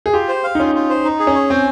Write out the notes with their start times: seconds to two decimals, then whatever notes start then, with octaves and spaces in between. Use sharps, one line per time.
0.06 G#4
0.13 F4 G4
0.29 C5
0.44 F5
0.55 D#4
0.60 C#4 F4
0.75 F4
0.90 C5
1.05 D#4
1.20 G#4
1.27 C#4
1.35 C#5
1.50 C4 G#5